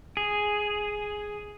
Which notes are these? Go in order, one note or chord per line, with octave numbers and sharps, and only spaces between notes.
G#4